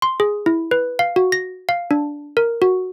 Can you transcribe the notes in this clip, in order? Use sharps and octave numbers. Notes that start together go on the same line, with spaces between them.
C6
G#4
E4
B4
F5
F#4
A#6
F5
D4
A#4
F#4